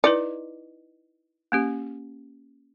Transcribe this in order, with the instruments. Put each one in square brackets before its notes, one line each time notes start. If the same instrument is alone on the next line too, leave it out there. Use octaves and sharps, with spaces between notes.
[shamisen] D#4 D5 [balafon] E4 B4
[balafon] A#3 C#4 G4